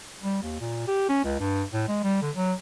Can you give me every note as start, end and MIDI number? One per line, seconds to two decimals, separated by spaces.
0.23 0.39 55
0.43 0.58 39
0.60 0.83 46
0.88 1.06 67
1.09 1.24 61
1.24 1.37 37
1.40 1.63 43
1.73 1.84 45
1.88 1.99 56
2.04 2.18 55
2.22 2.30 50
2.35 2.53 54